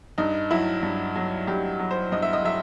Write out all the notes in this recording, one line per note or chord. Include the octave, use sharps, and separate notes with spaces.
G2 D#4
F#3 E4
G2
F#3
G2 G4
F#3
C5
G2 D#5
E5
D#5
F#3 E5